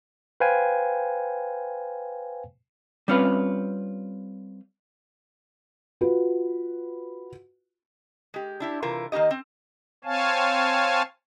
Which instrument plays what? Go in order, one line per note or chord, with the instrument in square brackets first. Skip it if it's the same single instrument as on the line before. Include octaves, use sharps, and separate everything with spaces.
[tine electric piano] B4 C5 F5 G5 G#5
[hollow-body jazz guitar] G3 C4 C#4 F4 B4
[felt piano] F4 F#4 B4
[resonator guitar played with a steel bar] G#3 G4
D4 E4 G4
C3 E3 F4 A#4
D#3 A#3 D#4 G4 D#5
C4
[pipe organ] C4 C#5 F5 G#5 A5